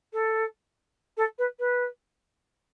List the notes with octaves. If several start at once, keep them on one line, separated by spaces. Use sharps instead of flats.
A4
A4
B4
B4